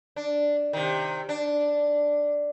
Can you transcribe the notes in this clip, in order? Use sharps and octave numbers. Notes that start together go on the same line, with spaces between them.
D4
C3 D#3
D4